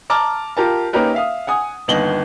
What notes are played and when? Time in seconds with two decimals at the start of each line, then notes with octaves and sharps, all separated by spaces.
0.10 A5 A#5 D6 F6
0.57 F4 G4 A#4 A5
0.93 A#3 C#4 D#4 G4 A#4 B4
1.14 E5 F5 D#6
1.47 F#5 G#5 D#6
1.88 G1 D#2 B3 D#5 F#7 G7